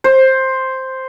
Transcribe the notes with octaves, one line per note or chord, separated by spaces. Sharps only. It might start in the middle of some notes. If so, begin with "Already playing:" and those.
C5